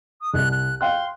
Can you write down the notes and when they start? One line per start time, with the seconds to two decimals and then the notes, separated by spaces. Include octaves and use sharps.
0.21 D#6
0.34 C2 F#6
0.51 F#6
0.81 F5 G5 C6 F#6